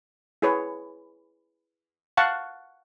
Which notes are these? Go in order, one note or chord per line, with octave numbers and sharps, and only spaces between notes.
E4 G#4 B4 C#5
F5 F#5 A5 C#6